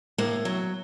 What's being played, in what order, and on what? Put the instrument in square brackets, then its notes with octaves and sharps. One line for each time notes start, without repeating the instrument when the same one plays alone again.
[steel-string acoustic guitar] A2 A#3
F#3